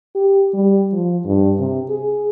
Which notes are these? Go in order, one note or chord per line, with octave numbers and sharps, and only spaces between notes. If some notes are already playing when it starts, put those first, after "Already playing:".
G4
G3
F3
G2
C3
G#4